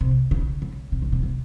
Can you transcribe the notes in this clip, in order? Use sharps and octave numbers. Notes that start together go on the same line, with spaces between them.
C3
C#3
C#3
C3
C#3
C3
C3